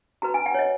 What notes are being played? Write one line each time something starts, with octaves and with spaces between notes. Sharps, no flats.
F#4 B4 A#5
G#5
F#5
C#5
D#5